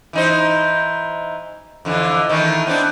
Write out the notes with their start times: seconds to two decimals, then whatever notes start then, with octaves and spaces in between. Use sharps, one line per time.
0.13 E3 D#4 C5
1.85 F2 D3 E3
2.29 D#3 E3 A3
2.67 B3 C4 D4